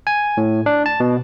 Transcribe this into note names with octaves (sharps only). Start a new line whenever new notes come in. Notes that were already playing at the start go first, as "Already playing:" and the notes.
G#5
A2
D4
A5
B2